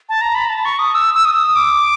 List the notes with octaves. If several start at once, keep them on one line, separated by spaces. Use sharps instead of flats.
A5
A#5
B5
A#5
A5
C#6
D#6
E6
E6
D#6
D6